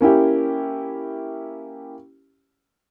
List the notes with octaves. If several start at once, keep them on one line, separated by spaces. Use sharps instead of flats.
A#3 C#4 E4 G4